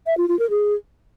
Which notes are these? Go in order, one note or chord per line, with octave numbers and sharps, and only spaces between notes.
E5
F4
F4
A#4
G#4